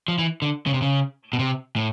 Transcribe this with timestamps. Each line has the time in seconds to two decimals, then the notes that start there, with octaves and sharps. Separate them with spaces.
0.08 F3
0.19 E3
0.42 D3
0.67 C#3
0.74 C3
0.82 C#3
1.33 B2
1.39 C3
1.76 A2